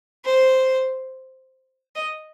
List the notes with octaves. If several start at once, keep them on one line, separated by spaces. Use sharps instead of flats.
C5
D#5